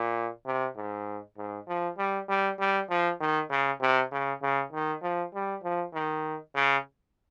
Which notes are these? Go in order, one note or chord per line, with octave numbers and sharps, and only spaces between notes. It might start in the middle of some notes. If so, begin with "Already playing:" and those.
Already playing: A#2
C3
G#2
G#2
F3
G3
G3
G3
F3
D#3
C#3
C3
C#3
C#3
D#3
F3
G3
F3
D#3
C#3